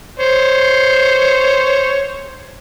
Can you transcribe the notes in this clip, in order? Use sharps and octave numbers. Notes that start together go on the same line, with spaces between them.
C5 C#5